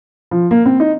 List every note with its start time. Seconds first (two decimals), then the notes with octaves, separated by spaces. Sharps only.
0.31 F3
0.51 A#3
0.66 C4
0.80 D#4